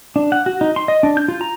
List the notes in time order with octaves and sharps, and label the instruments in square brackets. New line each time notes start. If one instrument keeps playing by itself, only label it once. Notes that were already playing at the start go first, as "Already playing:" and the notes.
[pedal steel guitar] D4
F#5
F#4
D#4
C6
D#5
D4
G6
F4
A#5